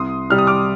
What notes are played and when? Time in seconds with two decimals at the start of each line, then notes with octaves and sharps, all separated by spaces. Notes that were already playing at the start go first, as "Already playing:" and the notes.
Already playing: C2 C6 D#6
0.30 C3 G3 F6
0.38 D#6
0.47 D6 F6